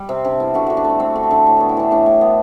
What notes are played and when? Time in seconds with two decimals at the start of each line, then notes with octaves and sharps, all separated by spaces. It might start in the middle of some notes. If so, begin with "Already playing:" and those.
Already playing: G3
0.09 C3 C4
0.24 C3 D4
0.40 B3 E4
0.54 D3 F#4
0.67 D3 F#4
0.77 D4
0.85 A3 C4
1.00 A3 C4
1.16 D3
1.23 E4
1.31 D3
1.46 A2
1.57 B3 F#4
1.69 E4
1.77 E3 D4
1.91 A2 D4
2.06 A2
2.21 B3